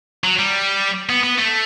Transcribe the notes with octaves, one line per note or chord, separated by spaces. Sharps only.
F#3
G3
B3
B3
A3